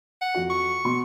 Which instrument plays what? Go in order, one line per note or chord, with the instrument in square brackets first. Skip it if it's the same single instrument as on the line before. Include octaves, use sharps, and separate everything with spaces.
[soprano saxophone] F#5
[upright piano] F2 F#4
[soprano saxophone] C#6
[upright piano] B2 C6